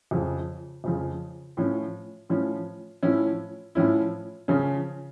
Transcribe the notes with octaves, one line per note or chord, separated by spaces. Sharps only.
F2 C#3 F3
F2 C#3 F3
A2 F3 C#4
A2 F3 C#4
A2 F3 C#4 E4
A2 F3 C#4 E4
C#3 F3 C#4 F4